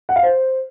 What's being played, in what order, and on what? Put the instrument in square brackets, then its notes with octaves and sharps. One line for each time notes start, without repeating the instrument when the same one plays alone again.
[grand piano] F#5
F5
C5